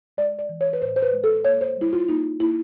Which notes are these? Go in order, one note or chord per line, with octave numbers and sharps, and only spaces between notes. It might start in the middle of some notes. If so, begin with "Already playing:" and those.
G#3 D5
D5
E3
C#5
B4
A2 C5
C5
B4
G#3
A4
A#3 C#5
C5
G3 E4
F4
A#3 D#4
A#3 E4